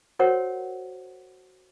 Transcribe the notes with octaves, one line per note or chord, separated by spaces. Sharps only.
F#4 A#4 C5 C#5 F#5